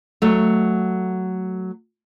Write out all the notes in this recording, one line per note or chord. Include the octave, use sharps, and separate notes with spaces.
F#3 A3